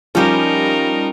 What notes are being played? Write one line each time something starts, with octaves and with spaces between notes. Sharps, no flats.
F3 G3 C#4 D#4 G4 A#4